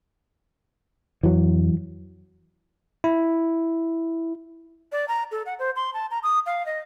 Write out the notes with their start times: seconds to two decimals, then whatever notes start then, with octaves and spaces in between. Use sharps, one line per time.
1.23 F2 E3 F#3
3.04 E4
4.92 D5
5.08 A#5
5.31 A4
5.46 F#5
5.59 C5
5.76 C6
5.94 A5
6.11 A#5
6.23 D#6
6.46 F5
6.66 D#5